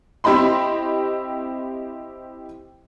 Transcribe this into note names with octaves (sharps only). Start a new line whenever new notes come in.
C4 E4 G4 D#5 B5 C6